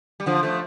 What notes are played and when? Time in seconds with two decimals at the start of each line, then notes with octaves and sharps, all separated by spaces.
0.20 G3
0.26 D3 F3
0.43 F3 A3